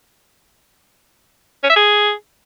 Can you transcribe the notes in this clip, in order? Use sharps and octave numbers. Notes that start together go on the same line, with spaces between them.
C#4
E5
G#4